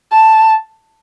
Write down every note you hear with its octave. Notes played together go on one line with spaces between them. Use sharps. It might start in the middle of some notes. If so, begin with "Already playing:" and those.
A5